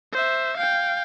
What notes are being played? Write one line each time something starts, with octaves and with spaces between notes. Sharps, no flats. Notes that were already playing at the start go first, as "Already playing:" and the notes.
C5 E5
F5 G5